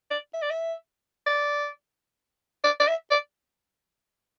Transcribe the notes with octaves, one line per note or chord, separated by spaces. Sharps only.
D5
E5
D5
E5
D5
D5
D5
E5
D5